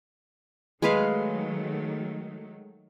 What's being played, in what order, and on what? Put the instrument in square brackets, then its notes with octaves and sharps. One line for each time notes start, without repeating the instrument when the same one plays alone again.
[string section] D#3 F#3 A3 [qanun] G#3 B4 F5